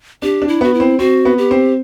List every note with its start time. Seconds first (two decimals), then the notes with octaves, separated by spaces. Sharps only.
0.22 D4 G4
0.42 D4
0.48 E4
0.61 B3 F#4
0.74 E4
0.80 C4
0.99 C4 F#4
1.25 B3
1.38 G4
1.51 C4